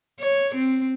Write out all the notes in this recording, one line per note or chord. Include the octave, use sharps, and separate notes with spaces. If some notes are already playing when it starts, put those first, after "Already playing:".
C#5
C4